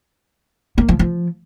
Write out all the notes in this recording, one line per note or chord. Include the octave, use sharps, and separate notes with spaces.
A#3
F3
F3